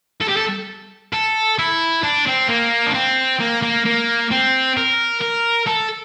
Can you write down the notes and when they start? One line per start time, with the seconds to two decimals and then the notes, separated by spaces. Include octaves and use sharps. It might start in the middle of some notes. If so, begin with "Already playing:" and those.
0.21 A4
0.29 G4
0.37 A4
1.13 A4
1.59 E4
2.03 D4
2.27 C4
2.49 A#3
2.87 D4
2.94 C4
3.40 A#3
3.63 A#3
3.86 A#3
4.31 C4
4.77 A#4
5.21 A#4
5.67 A4